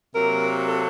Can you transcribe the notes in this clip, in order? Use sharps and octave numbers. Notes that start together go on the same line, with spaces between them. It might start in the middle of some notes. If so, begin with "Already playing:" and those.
C3 F#3 A#3 A#4
A4